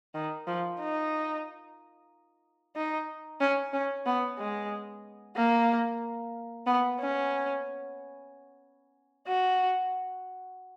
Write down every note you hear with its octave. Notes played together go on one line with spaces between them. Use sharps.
D#3
F3
D#4
D#4
C#4
C#4
B3
G#3
A#3
B3
C#4
F#4